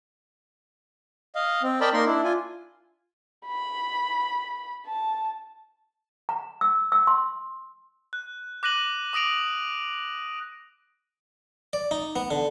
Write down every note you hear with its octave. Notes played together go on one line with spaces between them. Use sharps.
D#5 F5
C4
A#4 D5 D#5 G5 A5 B5
A#3 D#4 A#4 C6
D4 E4
F4 G#5
B5
A5
A#5
E6
E6
C6
F#6
D6 F#6 A#6 D#7 F#7
D6 D#6 A#6 D7 F7
D5
D#4
B3
D3